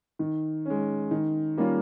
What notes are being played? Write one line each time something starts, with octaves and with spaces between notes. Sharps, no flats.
D#3
G#3 C#4
D#3
G3 A#3 C#4 F4